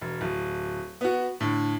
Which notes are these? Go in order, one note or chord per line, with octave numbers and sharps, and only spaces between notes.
E1
D1
B3 F#4
A2 D3